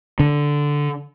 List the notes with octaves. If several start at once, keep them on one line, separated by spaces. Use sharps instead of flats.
D3